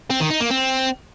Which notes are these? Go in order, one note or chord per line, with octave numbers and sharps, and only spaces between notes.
C4
D#3
D#4
A#3
C4